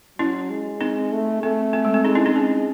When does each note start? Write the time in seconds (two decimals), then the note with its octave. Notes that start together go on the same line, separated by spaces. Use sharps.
0.19 F#3 C#4 E4
0.50 G#3
0.81 C4 D#4
1.12 A3
1.43 A3 C4
1.73 C4
1.85 G#3
1.94 C4
2.05 G#3 C4 D#4
2.15 C#4 E4
2.26 C4 D#4
2.35 G#3 C#4